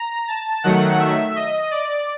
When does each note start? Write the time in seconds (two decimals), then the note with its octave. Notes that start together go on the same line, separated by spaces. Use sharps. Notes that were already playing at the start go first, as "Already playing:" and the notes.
Already playing: A#5
0.28 A5
0.64 D#3 F#3 A3 F#5
0.99 E5
1.36 D#5
1.71 D5